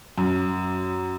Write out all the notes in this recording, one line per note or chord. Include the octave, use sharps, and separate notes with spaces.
F#2